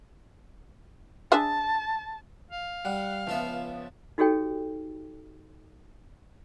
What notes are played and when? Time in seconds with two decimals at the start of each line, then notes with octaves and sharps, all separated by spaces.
1.32 D4 G#4 E5 A5
2.51 F5
2.85 G3 F#5
3.27 C#2 F3 B3 F4 E5
4.18 D#4 F#4 G4 A4 C#5 G5